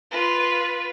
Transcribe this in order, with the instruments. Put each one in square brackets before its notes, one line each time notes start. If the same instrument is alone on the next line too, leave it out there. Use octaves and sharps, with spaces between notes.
[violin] F4 B4